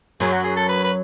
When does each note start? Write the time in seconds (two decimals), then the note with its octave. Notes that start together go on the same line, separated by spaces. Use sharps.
0.20 F#2 F#3 G#4
0.32 F#4
0.44 G#4
0.56 A4
0.69 B4
0.84 B4